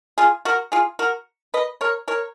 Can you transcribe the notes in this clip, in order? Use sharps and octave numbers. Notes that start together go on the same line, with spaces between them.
F4 G#4
F#4 A#4
F4 G#4
F#4 A#4
B4 D#5
A#4 C#5
A#4 C#5